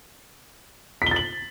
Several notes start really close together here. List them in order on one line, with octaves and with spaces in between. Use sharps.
B6 G7 A6 F#7